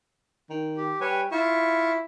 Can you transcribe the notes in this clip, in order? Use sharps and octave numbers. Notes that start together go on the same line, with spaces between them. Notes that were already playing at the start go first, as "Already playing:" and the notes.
D#3
G4
G3 B4 C#5 G#5
E4 F4 C#6